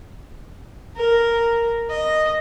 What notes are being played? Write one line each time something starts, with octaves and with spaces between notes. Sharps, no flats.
A#4
D#5